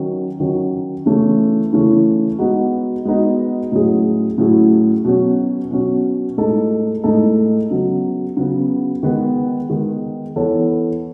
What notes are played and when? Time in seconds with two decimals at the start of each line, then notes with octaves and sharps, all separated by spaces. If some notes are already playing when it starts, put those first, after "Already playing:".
Already playing: D#3 F#3 C#4
0.40 D#3 F#3 C#4
1.06 C#3 E3 A3 C#4 E4
1.73 C#3 E3 A3 C#4 E4
2.39 G#3 B3 D#4 F#4
3.05 G#3 B3 D#4 F#4
3.72 A2 F#3 C#4 E4 G#4
4.38 A2 F#3 C#4 E4 G#4
5.05 B2 F#3 C#4
5.71 B2 F#3 C#4
6.38 A2 G#3 D#4 A4
7.04 A2 G#3 D#4 A4
7.70 C#3 F#3 B3
8.37 C#3 F#3 B3
9.03 D#3 G#3 B3
9.69 D#3 G#3 B3
10.36 E3 B3 E4 A4 C#5